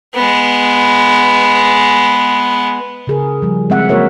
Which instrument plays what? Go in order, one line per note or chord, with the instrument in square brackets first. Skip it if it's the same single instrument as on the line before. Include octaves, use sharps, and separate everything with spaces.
[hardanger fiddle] G#3 B3
[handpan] C#3 G#4 A#4
F3 G3
G#3 C4 E5 F#5
F#3 A#3 F#4 A#4 C#5 E5